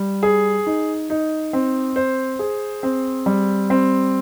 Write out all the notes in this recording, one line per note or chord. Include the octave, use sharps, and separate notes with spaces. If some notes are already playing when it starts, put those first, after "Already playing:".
Already playing: G3
G#4
D#4
D#4
C4
C5
G#4
C4
G3
C4